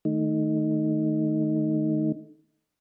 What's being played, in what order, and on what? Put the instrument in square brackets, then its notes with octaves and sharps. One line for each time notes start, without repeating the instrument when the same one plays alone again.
[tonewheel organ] D#3 A3 D#4